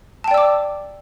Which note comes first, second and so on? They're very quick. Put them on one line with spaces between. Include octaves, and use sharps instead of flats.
A5 G5 D5 E6 D6